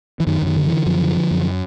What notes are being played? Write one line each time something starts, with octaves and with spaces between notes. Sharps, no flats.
E3
F#2 D#3
F#2 D#3
D3
E3
D3
F#2 F3
D3
D3
F#2